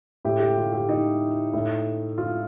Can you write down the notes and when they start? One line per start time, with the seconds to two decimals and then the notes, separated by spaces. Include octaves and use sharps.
0.25 A2 G4
0.40 G4
0.57 F4
0.73 G4
0.89 D#4
1.53 A2
2.18 F4